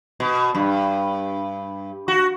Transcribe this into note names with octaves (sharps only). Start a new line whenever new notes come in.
B2
G2
F#4